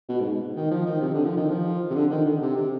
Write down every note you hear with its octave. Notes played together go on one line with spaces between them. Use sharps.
B2
G#2
D#3
F3
D#3
C3
D3
F3
D#3
F3
C3
D3
D#3
D3
C3
C3